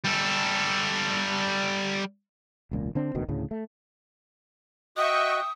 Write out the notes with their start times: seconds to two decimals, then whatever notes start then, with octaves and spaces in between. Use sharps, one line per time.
0.04 G3 A4
2.71 E1 C#2 A#2
2.95 D3 C4 D4
3.15 E1 D2 B2 D#3
3.28 D2 A2 C#3
3.51 A3
4.97 F#4 D#5 E5 G5 C#6 D#6 F#6